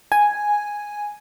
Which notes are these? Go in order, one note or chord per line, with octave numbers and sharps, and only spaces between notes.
G#5